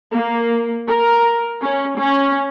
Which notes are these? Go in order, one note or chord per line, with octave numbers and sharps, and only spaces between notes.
A#3
A#4
C#4
C#4